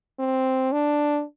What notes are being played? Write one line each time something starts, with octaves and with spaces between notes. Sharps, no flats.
C4
D4